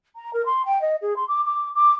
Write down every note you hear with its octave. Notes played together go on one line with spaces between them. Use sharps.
A#5
A#4
C6
G5
D#5
G#4
C6
D6
D6
D6